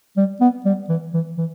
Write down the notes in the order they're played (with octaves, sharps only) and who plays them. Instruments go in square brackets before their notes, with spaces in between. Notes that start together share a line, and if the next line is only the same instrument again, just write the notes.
[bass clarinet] G3
B3
G3
E3
E3
E3